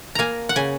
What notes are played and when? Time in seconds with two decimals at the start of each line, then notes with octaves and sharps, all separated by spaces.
0.15 A#3 G#5 A#5
0.49 F#5
0.56 C#3 G#5